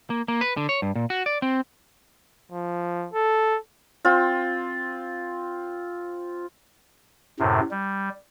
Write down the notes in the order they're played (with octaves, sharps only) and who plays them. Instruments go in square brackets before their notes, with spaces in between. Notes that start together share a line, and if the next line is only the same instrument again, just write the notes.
[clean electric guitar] A#3
A#3
B4
D3
C#5
G2
A#2
F#4
D5
C4
[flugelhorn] F3
A4
[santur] C4 F4
[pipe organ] F#2 A2 C3
G3